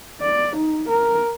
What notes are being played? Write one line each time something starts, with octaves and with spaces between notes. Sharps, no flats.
D5
D#4
A#4